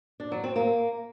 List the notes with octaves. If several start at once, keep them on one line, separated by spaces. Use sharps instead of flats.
D4
F#3
C4
A#3